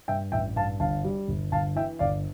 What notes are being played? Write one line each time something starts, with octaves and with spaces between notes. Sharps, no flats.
G2 E5 G5
A1 E5 G5
G2 F5 A5
G1 F5 A5
G3
G1
G1 F5 A5
E3 E5 G5
G1 D5 F5